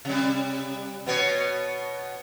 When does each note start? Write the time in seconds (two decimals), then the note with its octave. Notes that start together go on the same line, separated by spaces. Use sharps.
0.05 C3 G3
1.06 B2 B3 C#5